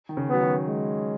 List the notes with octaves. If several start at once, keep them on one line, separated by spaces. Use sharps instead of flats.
D#3
C#3
F#3 B3
D#3
G#3